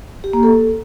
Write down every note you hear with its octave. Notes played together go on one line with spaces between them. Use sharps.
G4
A#3
A4